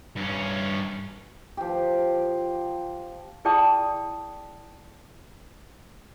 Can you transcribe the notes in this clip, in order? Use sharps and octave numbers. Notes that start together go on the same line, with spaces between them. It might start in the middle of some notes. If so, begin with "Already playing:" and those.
G2 C#4
F3 G4
E4 G#4 D5 G5 A5 D#6